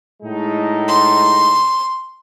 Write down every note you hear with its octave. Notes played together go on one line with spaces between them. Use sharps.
A2 G#3 D#4
C6